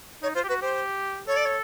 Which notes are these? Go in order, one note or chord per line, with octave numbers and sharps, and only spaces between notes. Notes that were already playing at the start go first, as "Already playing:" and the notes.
D#4 C#5
F4 C5
G4
F#4 B4
G4 C5
A4 C#5
D5
C#5